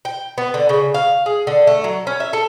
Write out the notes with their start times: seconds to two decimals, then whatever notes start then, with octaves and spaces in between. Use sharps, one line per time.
0.05 G5
0.38 B3
0.54 D3
0.69 C#3
0.94 F5
1.26 G#4
1.47 D3
1.67 A3
1.84 F#3
2.07 C#4
2.20 E5
2.33 A4